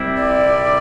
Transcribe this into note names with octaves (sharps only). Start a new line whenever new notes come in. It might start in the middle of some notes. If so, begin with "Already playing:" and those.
Already playing: C2 C3 G3 C4 E4
D5